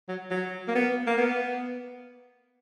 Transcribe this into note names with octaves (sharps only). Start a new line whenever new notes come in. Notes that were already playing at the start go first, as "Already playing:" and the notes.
F#3
F#3
A#3
B3
A#3
B3